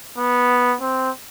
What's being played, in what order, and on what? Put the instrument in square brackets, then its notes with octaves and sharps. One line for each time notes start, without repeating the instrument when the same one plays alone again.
[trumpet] B3
C4